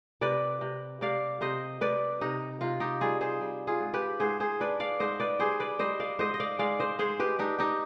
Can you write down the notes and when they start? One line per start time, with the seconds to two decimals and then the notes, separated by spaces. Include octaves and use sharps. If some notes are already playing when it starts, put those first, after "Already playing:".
0.21 C3 B4 D5
0.61 C3
1.01 C3 D5 F5
1.41 C3 C5 D#5
1.81 C3 B4 D5
2.21 C3 D#4
2.61 C3 F4
2.80 D#4 G4
3.01 G3 F4 G#4
3.21 G#4 C5
3.41 G3
3.67 F4 G#4
3.80 G#2
3.94 G4 B4
4.20 G#2 G#4 C5
4.40 G#4 C5
4.60 D4 B4 D5
4.80 D5 F5
5.00 G#2 C5 D#5
5.20 B4 D5
5.39 G3 G#4 C5
5.60 B4 D5
5.79 G3 C5 D#5
6.00 D5 F5
6.19 G#2 C5 D#5
6.34 D#5
6.40 D5 F5
6.59 G#3 D5 F5
6.79 C5 D#5
6.99 G#3 G#4 C5
7.20 G4 B4
7.39 D4 D#4 G4
7.59 D#4 G4